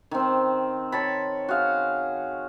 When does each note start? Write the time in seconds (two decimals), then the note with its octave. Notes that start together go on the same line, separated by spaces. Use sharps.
0.11 D#3 C4
0.92 C#5 A5 B5
1.49 F#4 G#4 F5